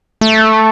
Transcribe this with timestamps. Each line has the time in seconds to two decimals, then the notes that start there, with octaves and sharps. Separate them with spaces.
0.21 A3